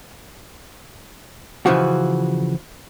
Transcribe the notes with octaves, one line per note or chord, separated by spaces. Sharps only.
C#3 E3 F3 F#4